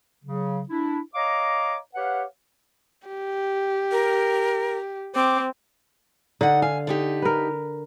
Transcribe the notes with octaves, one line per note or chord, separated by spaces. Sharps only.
C#3 F#3
D4 E4
C#5 D#5 F5 A#5 D6
G4 B4 C#5 F5 F#5
G4
A#4
C4 D6
D3 D#4 F#5
F5 G#5
D3 D#4 G4
A#4 B4